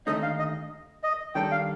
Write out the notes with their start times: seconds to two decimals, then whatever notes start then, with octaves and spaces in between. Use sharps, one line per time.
0.07 D#2 D3 A3 D#4 D#5
0.23 F5
0.39 D#5
1.03 D#5
1.35 D#3 G3 D4 A4 G5
1.52 F5